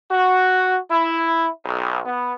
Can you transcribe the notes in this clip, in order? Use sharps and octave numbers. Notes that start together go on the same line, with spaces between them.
F#4
E4
B1
B3